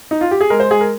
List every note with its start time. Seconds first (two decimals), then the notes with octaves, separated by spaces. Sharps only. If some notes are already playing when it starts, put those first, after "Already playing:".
0.11 D#4
0.21 F4
0.31 G4
0.41 G#4
0.50 G#3 A#4
0.60 C5
0.71 G#3 G#4
0.81 A#4